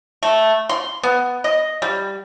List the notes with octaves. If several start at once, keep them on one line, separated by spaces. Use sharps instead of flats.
A3
C6
B3
D#5
G3